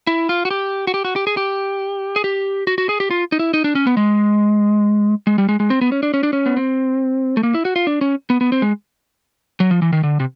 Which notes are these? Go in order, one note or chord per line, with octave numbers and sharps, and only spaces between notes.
E4
F4
F#4
G4
F#4
G4
F#4
G4
G#4
G4
G#4
G4
F#4
F#4
G#4
G4
F4
D#4
E4
D#4
D4
C#4
B3
G#3
G#3
G3
G#3
G#3
C4
B3
C#4
D4
C#4
D4
C#4
B3
C4
A3
A#3
E4
F#4
F4
D4
C#4
B3
B3
C4
G#3
F#3
F3
E3
D#3
D3
C3